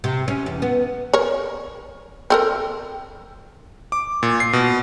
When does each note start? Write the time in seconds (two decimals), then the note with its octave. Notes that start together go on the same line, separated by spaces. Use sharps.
0.04 C3
0.28 C#4
0.46 E2
0.62 B3
1.13 A#4 C#5
2.30 C4 A4 A#4
3.92 D6
4.23 A#2
4.40 C7
4.53 B2